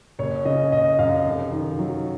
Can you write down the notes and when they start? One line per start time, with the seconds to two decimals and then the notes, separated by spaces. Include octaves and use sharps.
0.19 F#1 C#5
0.45 C#3 D#5
0.72 F#1 D#5
0.99 F#2 F5
1.25 F1
1.52 D#3
1.79 F#3